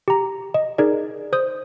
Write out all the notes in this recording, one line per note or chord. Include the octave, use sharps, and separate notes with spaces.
G4 A#5
D#5
D#4 G#4 A#4 D5
C5 D#6 G6